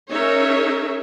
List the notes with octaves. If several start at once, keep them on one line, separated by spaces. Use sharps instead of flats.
C#4 D#4 G#4 A#4 C#5 E5